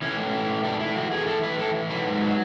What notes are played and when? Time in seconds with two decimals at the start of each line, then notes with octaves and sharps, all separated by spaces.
0.02 E3 C#4
0.17 A2
0.33 E3
0.49 A2
0.64 E3 D4
0.79 A2 E4
0.96 E3 F#4
1.11 A2 G#4
1.26 E3 A4
1.42 A2 B4
1.58 E3 A4
1.75 A2
1.89 F#3 B4
2.05 G#2
2.21 F#3